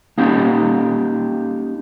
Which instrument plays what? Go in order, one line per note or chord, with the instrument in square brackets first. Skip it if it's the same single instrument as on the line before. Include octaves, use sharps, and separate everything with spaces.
[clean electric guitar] A#3 C#4 D#4 G4